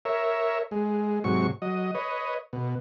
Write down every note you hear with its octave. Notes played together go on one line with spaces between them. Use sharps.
A#4 C#5 E5
G#3
G#2 C3 F#3 C#6
F#3 D#5
B4 C#5 D#5
B2